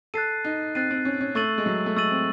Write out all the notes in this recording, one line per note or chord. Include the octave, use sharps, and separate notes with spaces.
A4 F#6 A6 C7 D#7
D#4
C4 F#6 A6 C7 D#7
C4
C#4
C#4
A3 C#6 E6 A6 D#7 F#7
G#3
F#3
A3
G#3 C#6 E6 A6 D#7 F#7
C4